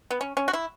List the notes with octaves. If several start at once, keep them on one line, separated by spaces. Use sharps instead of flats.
B3
C#4
C#4
F#4
E4